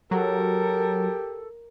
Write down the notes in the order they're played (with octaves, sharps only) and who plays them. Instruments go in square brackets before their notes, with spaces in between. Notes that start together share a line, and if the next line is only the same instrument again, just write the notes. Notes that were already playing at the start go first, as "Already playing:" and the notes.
[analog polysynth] F#3 [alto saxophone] G4 [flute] A4 [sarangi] A#4